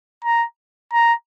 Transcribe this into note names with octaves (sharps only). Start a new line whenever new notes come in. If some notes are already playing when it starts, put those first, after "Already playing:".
A#5
A#5